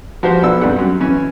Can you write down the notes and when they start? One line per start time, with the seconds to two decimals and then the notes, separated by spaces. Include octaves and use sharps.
0.23 F3 F#4 G4 C5
0.42 B1 B3 D4 E6
0.61 G2 C3 G3 F#5
0.79 F#2
1.00 E3 C#4